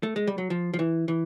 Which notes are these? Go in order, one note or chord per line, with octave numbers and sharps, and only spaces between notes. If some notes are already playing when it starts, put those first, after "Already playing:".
A3
G#3
G3
F#3
F3
F3
E3
E3